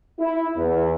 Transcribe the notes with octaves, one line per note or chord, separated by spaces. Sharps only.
E4
E2